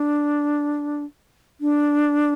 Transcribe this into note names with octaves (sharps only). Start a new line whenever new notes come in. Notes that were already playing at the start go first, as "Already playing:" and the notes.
Already playing: D4
D4